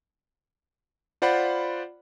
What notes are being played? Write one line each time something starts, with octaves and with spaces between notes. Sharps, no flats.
F4 C5 D5 F#5 B5